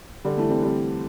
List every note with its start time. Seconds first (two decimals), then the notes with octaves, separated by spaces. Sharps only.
0.25 D3 G3
0.38 E3 A3
0.49 G3 C4
0.63 G3 C4